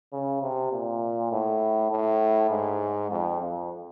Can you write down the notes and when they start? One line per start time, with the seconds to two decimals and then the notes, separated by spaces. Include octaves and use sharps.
0.13 C#3
0.42 C3
0.72 A#2
1.32 A2
1.91 A2
2.51 G#2
3.11 F2
3.40 F2